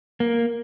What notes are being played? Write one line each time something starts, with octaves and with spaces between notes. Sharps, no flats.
A#3